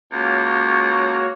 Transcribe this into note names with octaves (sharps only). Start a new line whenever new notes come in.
C#2 A#3 F#4 C#5